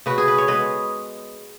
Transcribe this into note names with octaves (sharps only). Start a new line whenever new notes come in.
C#3 F#4 B4
G#4
B4
C#5
G#3 B3 B4 D#5